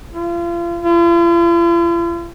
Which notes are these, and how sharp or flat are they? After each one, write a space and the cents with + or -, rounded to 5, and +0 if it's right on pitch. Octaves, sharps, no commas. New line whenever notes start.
F4 -35
F4 -45